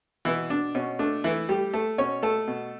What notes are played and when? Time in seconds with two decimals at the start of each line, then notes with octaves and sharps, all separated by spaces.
0.25 B2 E3 E4
0.50 B2 D4
0.75 B2 C#4
0.99 A3 D4
1.24 E3 A3 E4
1.49 G3 A3 G4
1.73 A3 A4
1.98 B2 C#4 C#5
2.23 A3 A4
2.47 B2